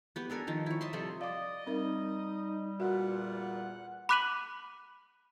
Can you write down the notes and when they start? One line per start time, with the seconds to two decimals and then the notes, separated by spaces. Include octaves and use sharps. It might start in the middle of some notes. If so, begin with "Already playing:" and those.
0.16 B3 G4 B4
0.30 D4 A4 A#4 G#5
0.47 D#3 F3 G5
0.66 E4 C#5
0.81 D#5 E5 A5 C6
0.93 C3 F3 G3 A4
1.21 D5 D#5 F5 D6
1.66 G3 C4 D#4 A#4 E5
2.80 E2 A#2 F#4 E5 F#5
4.09 B5 D6 F#6 B6 D#7 F#7